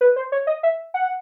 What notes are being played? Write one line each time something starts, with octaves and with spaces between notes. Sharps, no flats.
B4
C5
C#5
D#5
E5
F#5